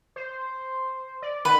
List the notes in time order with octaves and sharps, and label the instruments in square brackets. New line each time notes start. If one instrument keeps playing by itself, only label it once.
[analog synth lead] C5
D5
[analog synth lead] D#3 [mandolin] B4